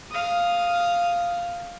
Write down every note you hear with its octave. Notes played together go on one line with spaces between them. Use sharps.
F5 D#6